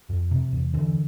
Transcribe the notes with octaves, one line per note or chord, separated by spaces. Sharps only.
F2
C3
E2
D3 E3